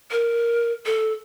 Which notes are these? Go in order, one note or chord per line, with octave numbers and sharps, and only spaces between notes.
A#4
A4